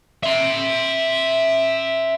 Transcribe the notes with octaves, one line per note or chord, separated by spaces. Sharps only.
E5 C6